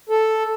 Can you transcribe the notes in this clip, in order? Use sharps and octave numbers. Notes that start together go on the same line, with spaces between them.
A4